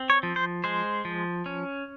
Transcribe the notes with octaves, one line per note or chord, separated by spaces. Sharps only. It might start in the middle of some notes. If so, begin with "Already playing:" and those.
Already playing: C4
C#5
F3
C5
G#3 C5
F3
C#4